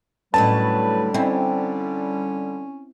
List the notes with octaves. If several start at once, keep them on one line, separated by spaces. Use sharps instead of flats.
A2 D3 F#3 G3 C#4 B4 A5
C4 C#4 E4